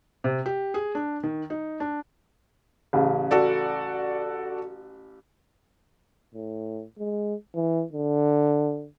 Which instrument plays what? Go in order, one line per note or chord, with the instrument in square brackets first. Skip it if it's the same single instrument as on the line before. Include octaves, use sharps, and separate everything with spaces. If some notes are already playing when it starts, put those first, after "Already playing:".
[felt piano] C3
G4
G#4
D4
D#3
D#4
D4
[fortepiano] A1 C#3
[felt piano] F#4 A4 D5
[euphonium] A2
G#3
E3
D3